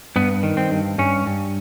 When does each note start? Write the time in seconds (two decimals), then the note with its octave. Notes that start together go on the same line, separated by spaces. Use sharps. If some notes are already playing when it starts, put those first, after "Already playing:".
0.16 G2 B3
0.43 D#3
0.57 C4
0.71 G2
0.98 G2 C#4
1.27 G2